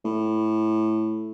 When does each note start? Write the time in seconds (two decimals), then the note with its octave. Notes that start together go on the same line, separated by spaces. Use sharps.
0.05 A2